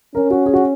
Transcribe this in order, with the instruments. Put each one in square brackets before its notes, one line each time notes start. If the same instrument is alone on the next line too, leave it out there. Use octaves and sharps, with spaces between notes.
[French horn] C#4 [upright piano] A#4
[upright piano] F#4
G#4
F#4